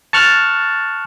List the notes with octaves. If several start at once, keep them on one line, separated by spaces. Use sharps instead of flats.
A5 C#6 F6 F#6 A6